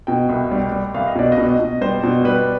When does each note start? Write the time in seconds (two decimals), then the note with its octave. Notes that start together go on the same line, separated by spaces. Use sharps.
0.07 B2 G5
0.29 C2
0.51 G3
0.72 G3
0.94 C2 F5
1.07 D#5
1.15 B2 D5
1.32 D#5
1.38 B2
1.60 B2
1.81 G3 C5
2.03 B2
2.24 G3 B4